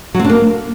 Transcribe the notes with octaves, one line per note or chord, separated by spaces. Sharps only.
F#3
C4
D4
A#3